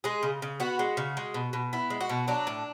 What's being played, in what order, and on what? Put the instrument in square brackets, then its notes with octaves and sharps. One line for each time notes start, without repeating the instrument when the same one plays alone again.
[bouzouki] G#3 G#4
C#3
C#3
B3 F#4
G#3
C#3
G#3
B2
B2
B3 E4
G#3
F#4
B2
F#3 D4
A2